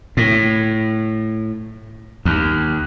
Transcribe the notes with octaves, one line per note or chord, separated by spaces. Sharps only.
A2
D#2